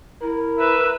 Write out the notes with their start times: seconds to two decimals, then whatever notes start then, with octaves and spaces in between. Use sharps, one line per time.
0.22 E4 A#4
0.59 B4 E5